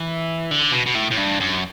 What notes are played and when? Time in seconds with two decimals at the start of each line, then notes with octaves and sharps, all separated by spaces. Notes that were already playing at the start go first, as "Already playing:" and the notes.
Already playing: E3
0.51 D3
0.72 B2
0.86 B2
0.95 A2
1.11 A2
1.18 G2
1.40 F#2